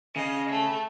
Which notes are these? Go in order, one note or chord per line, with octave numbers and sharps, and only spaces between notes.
C#3 D#5
A3